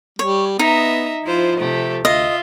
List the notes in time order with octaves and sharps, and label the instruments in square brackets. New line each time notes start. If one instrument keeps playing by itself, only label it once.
[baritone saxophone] G3 [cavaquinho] C#5
[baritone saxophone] B3 [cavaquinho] D#4 [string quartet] D#5 E5 A#5
[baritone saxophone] F3 [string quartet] E4 F4 C5
[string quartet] C3 A3 G4
[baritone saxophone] D2 [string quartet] F4 E5 [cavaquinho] D#5